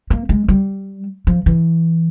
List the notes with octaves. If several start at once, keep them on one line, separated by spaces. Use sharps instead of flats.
A#3
G#3
G3
F3
E3